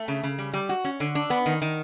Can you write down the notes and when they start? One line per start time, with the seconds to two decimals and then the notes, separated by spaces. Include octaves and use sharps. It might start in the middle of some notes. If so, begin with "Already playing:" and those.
Already playing: A3
0.08 C#3
0.23 C#3
0.39 G3
0.53 G3
0.69 F#4
0.84 C#4
1.00 D3
1.15 D4
1.30 B3
1.46 D#3
1.62 D#3